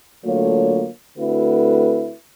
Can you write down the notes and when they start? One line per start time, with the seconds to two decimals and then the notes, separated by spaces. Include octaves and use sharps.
0.25 D3 F#3 A3 A#3 F4 C#5
1.18 D3 A3 C4 E4 F#4 B4